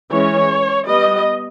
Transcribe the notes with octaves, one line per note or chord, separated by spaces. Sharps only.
E3 G#3 C#4 C#5
G3 B3 D#5